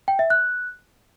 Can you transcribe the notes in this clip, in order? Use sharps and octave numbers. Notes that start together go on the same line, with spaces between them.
G5
E5
F#6